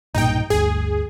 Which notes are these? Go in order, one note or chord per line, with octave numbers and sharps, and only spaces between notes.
B1 G2 A#2 D#4 G5
G1 D2 G#4